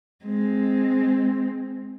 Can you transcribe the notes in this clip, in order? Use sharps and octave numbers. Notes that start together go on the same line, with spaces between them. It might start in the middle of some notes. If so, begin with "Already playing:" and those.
G#3 C4